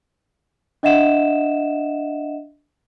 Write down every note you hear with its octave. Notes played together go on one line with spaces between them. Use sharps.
D4 D#5 E5 F#5 E7